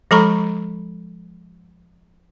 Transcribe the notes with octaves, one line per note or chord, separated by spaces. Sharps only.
F3 G#3 A4 A#5 B5 C#6